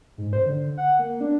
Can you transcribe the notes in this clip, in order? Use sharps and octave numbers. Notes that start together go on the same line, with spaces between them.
G#2
C5
D3
F#5
A#3
D4